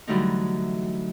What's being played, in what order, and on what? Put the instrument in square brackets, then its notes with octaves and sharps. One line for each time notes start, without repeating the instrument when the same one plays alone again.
[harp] D3 E3 F#3 G3 A3 D#4